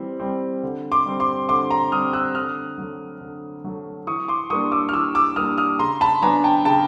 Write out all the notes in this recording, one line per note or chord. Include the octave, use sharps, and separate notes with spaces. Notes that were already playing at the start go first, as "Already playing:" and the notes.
Already playing: E3 G3 C4
G3 C4
D3
C6 D6
G3 C4
C6 D6
D3 C6 D6
A#5 C6
G3 C4 D#6 F6
E6 F#6
D3 D#6 F6
F#3 A3
D3
F#3 A3
E3 C#6 D#6
C6 D6
G3 A#3 D4 C#6 D#6
D6 E6
F6
E3 D6 E6
D6 E6
G3 A#3 D4 D#6 F6
D#6 F6
C#3 A#5 C6
A5 B5
F#3 B3 D4 G#5 A#5
G5 A5
C#3 G5 A5